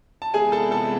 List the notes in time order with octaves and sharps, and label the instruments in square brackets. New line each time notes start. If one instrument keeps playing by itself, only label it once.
[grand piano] A5
[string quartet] C3 E3 G#3 B3 E4 [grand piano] G#4 G#5
[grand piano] A4 A5
A4 A5